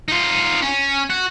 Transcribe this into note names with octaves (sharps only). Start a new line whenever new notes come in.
D#4 F4
C#4
F#4